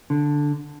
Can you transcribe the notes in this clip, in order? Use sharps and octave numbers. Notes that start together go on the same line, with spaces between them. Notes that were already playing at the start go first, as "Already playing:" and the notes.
D3